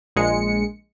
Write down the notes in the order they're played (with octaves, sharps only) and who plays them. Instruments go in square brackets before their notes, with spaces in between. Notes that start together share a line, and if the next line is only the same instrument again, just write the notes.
[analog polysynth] A#1 G#3 C#7